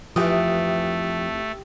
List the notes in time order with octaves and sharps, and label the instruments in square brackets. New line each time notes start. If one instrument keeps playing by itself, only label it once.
[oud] F2 E3 [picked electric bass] F3 [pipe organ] A3 [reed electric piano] G4 G5 D#6